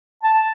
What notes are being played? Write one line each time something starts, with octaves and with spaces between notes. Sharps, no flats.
A5